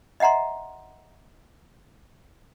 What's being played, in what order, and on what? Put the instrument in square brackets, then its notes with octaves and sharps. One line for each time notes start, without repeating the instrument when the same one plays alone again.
[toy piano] D#5 E5 F#5 A#5 C6